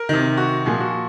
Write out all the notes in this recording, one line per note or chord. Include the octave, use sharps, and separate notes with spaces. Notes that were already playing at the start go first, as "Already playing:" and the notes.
Already playing: A#4
C3 D#3
F#4
A#2 F3 G#4
F#4